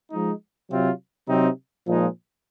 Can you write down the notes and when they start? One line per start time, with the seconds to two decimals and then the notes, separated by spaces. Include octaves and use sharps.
0.11 F3 G#3 D#4
0.69 C3 F#3 C4 F4
1.27 C3 F#3 C4 D#4
1.86 A#2 F3 G#3 D#4